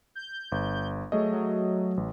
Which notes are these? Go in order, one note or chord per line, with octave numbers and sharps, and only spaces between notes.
G6
G1
F#3 A3 G#4 D#5
F#3
A1